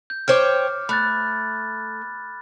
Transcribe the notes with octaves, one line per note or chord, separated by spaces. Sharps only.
G6
C5 C#5 G5 D6 F6
A3 B5 F#6 A6